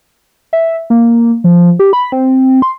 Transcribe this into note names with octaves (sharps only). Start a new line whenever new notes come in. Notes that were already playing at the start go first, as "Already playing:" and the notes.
E5
A#3
F3
G4
B5
C4
C6